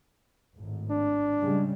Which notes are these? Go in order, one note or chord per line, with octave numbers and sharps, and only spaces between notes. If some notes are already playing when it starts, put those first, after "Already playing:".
G#1 A2
D4
C#3 G3 G#3